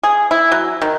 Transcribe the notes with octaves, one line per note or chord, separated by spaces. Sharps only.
G#4
E4
F#3
D#3